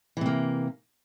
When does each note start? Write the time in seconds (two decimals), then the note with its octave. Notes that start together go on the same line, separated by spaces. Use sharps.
0.17 E3
0.21 C3
0.26 A#3